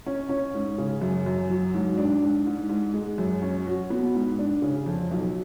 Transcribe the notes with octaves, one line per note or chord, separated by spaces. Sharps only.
C#4
C#4
G#2
C#3
F#2
F#2
F#3
G#2
D4
G#2
G#2
G#2
G#3
F#2
C#4
F#4
B3
G#2
D4
C#3
F2
B1